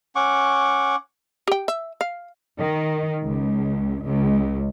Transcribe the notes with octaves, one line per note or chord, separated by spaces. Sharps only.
C#4 F#5 C#6 D6
G4 G5
E5
F5
D#3
C#2
C#2